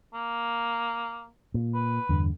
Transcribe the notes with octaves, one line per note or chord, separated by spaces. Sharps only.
A#3
A#2
B4
E2 G2 D3